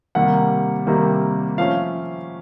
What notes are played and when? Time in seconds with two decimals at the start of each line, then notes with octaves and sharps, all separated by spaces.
0.15 C3 D#3 G3 A#3 F#5
0.87 C3 D#3 G3 A#3
1.58 F3 A3 C#4 F5